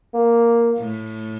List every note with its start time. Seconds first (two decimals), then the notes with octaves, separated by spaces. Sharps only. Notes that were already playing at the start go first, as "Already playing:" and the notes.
0.14 A#3
0.78 A2